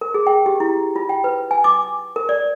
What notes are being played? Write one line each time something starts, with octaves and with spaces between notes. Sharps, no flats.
A#4
G#4
G5
G4
E4
F4
G5
B4
G#5
D6
A#4
D5